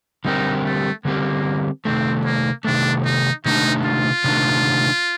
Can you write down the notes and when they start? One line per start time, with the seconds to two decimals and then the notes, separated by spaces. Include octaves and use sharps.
0.25 D3 G3 C4 D#4 G4 A#4
0.65 A3
1.05 D3 G3 A#3 C4 G4 A#4
1.85 C3 D#3 A3 C4
2.25 A#3
2.65 C3 D#3 A3 D4
3.05 D#4
3.45 C3 D#3 A3 D4 D#4
3.85 F4
4.24 C3 D#3 A3 D4